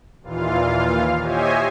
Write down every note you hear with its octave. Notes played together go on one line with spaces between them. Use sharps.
D#2 A#2 E3 F4 F5
G4 C5 C#5 D#5 E5 G#5